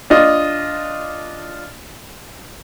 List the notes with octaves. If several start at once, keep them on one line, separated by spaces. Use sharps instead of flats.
D4 F4 D#5